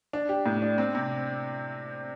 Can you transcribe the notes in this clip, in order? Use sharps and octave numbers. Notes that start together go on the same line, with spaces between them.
D4
G4
A2
D4
C4
C3